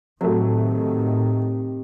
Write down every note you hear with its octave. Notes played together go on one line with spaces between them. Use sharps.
A2 C3 D#3 F#3 A3